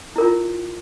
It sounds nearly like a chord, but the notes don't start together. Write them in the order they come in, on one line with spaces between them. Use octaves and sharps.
E4 A#4 F4